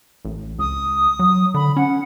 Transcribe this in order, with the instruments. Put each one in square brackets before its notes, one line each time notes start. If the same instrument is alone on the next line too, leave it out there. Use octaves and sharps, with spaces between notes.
[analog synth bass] A1
[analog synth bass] C#2 [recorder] D#6
[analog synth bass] F#3
[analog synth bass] D3 [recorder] B5
[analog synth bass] C#4 [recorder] F#5